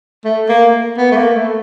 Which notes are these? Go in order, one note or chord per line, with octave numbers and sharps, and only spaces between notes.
A3
A#3
B3
A3
A#3
A3